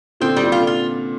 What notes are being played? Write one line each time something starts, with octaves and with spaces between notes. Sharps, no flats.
A#2 D3 C4
C3 G3
A#2 D3
F4
D3
C3 E3 F4